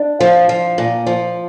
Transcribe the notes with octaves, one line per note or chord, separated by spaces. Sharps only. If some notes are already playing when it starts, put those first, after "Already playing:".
Already playing: D4
F3
F3
A#2
F3